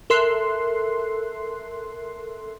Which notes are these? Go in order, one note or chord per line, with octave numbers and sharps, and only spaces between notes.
A4 A#4 E5 C6 F#6 C7